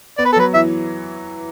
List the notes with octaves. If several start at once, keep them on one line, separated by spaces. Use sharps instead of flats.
B3 D5
B4
A4
F#3 B4
E3 E5